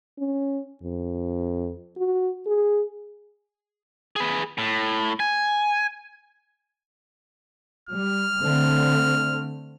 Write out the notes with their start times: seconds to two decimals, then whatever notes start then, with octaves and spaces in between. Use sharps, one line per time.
0.18 C#4
0.83 F2
1.97 F#4
2.46 G#4
4.16 G#4 B4
4.58 A2
5.20 G#5
7.89 G3 F6
8.42 D3 A3 C4